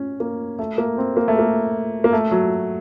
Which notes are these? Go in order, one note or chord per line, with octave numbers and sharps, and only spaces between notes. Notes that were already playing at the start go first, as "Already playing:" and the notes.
Already playing: C#4
A#3
A3
A#3
C4
A#3
A3
A#3
A#3
A3
F#3